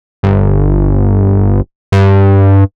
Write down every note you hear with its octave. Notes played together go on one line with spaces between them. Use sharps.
G1
G2